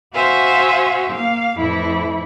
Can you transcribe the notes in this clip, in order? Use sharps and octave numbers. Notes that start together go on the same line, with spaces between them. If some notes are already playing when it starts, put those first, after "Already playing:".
F#4 C5 E5 F5 G#5
A#3 F5
F2 A2 E3 E4